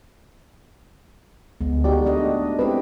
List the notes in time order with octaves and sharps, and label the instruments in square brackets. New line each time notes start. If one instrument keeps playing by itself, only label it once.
[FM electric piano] D2 [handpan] G#3 B3
[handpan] A3 D#4 F#4 [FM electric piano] G4 D5
[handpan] A3 D4 D#5
[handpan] G#3 E4 G4 [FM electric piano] C4 B4